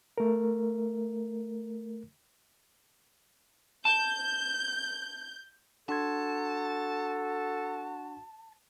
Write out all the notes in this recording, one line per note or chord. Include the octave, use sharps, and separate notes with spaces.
A3 A#4
A5 G6
D4 F#4 A4 A5 C6 G#6